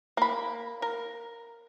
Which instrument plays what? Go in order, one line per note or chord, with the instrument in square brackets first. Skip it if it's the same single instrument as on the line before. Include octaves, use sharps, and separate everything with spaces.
[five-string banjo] A#3 B5
A#4